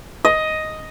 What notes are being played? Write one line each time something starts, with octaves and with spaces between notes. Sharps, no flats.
D#5